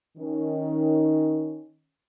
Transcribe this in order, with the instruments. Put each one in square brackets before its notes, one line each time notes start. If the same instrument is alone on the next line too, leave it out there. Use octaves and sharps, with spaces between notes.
[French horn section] D#3 C#4